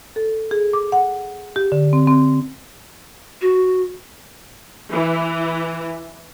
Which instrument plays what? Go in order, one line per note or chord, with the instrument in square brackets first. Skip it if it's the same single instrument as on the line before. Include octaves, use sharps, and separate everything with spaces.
[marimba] A4
G#4
D6
F#5
G4
D3
C4
C4
[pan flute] F#4
[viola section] E3